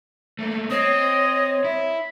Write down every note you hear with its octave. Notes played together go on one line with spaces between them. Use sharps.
A3 A#3
C4 C#5 D#5
E4